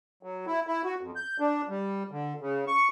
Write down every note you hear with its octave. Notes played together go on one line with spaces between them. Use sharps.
F#3
E4
E4
F#4
F2
G6
D4
G3
D3
C#3
C#6